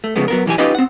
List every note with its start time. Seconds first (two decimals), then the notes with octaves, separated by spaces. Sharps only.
0.04 A3
0.16 C#3 F3 G#3 A3 B3
0.28 F#3 B3 A#4
0.46 B1 E3 G4 G#5
0.58 C#4 D#4 F4 G4 B4 D#5
0.75 C4 F#5